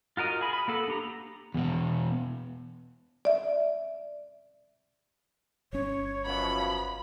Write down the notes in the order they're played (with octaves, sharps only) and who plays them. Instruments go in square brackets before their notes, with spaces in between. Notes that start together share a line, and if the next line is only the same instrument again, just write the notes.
[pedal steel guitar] F4 F#4 A#4 D#5 A#5
G#4 B5
B5
A#3 B3 A4
D4 G4 A#5
[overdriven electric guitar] E2 B2
[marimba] D5 E5
[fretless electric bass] G1 C#4 [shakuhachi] C#5
[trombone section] F#2 B2 F3 [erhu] B5